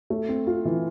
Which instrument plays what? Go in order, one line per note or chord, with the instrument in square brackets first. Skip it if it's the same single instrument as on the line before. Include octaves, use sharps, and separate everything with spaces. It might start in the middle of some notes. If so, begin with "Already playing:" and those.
[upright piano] A3
C4
F4
E3